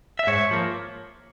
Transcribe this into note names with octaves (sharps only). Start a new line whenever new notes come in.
E5
G#2 C#5
F3 A#3